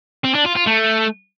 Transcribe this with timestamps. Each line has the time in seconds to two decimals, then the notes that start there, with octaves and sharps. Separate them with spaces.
0.25 C4
0.35 D4
0.46 F4
0.57 F4
0.67 A3